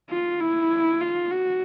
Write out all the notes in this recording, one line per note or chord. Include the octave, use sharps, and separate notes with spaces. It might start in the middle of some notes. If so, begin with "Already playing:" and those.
F4
E4
F4
F#4